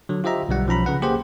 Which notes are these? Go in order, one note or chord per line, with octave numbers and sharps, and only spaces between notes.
D3 F#3
F4 G4 C5 D#5 E5 A#5
B1 D3 G3 F#5
B1 F3 C#4 A#5 B5
C#3 B4 F#5
A#3 G4 G#4 C5 F#5